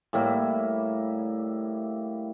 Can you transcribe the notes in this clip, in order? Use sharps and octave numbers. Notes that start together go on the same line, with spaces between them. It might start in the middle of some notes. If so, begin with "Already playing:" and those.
A2 G3 A#3 E4